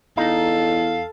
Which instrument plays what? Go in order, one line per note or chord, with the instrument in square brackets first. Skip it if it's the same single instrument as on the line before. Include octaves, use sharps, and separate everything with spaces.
[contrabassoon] E2 [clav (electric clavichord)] D#4 [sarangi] A4 [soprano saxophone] F5